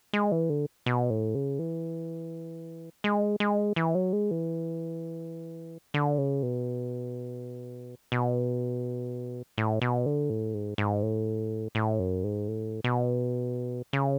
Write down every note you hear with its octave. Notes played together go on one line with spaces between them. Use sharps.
G#3
E3
D3
B2
A2
C#3
E3
G#3
G#3
E3
F#3
G#3
E3
D3
C#3
B2
B2
A2
B2
D3
A2
G#2
G#2
A2
A2
F#2
G#2
A2
B2
C#3